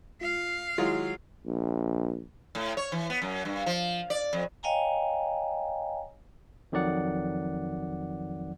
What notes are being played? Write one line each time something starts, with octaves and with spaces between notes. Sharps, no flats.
F4 F5
D#3 F#3 G#3 E4 F4
A#1
A2
C#5
E3
B3
F#2
G2
F3
D5
F2
C#5 D#5 F5 G5 G#5 A#5
F2 D#3 F#3 D5 F#5